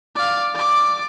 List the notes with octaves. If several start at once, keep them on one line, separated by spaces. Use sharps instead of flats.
D5 F5
D5 D6